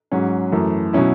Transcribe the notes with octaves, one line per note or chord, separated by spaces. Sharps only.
G#2 F#3 C#4
F#2 E3 A3 E4
B2 F#3 C#4 E4